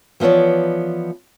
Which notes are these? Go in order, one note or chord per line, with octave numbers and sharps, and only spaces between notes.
E3 F3 B3 C#5 D5